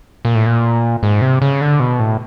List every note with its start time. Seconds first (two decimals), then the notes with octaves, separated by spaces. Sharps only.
0.25 A#2
0.35 A2
0.46 A#2
1.03 G#2
1.21 C3
1.42 C#3
1.61 D3
1.80 B2
2.00 A2